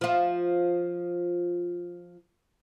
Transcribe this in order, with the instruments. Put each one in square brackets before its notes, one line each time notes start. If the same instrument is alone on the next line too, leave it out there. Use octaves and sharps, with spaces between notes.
[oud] F3 F4